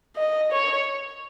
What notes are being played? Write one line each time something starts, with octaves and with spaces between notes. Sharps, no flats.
D#5
C#5